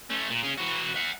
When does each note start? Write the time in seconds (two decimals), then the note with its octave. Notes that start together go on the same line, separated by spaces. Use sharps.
0.10 A3 C#4
0.30 A#2
0.43 C#4 G#4
0.58 E3 F#4
0.95 E5 F#5